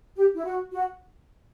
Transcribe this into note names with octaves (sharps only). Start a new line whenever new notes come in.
G4
E4
F#4
F#4